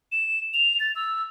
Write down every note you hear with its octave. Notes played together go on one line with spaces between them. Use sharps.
E7
F7
A6
E6